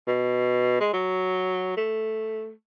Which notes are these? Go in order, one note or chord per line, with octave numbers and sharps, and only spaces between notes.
B2
G#3
F#3
A3